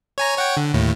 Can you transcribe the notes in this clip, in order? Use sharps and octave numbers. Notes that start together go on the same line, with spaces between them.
C#5 G#5 A#5
C#5 F#5 G5
D3
D#2 A2